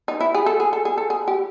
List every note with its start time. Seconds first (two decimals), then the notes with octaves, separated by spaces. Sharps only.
0.08 D#4
0.21 E4
0.34 G#4
0.46 A4
0.60 G#4
0.73 A4
0.85 G#4
0.98 A4
1.10 G#4
1.28 G4